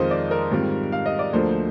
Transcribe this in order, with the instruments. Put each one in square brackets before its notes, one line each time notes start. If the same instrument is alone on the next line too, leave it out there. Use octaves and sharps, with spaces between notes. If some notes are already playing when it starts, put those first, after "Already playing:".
Already playing: [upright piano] F2 D#3 G#3 C4 F4 C5 D#5
D5
A#4
G#2 D#3 G3 C4 F4
F5
D#5
D5
D2 D3 F3 A#3 C5